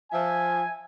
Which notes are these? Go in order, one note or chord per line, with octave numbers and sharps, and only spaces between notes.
F3 E5 G#5